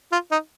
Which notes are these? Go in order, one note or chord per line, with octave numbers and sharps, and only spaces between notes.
F4
D#4